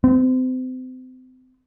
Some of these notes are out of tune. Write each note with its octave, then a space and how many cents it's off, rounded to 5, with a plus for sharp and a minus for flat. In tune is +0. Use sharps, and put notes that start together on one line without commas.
C4 -35